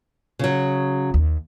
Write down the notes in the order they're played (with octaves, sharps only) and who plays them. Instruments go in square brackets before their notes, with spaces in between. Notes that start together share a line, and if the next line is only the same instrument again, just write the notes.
[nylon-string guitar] C#3 F#3
[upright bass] D#2